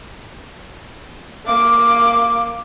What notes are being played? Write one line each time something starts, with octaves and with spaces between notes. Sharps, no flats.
A#3 D6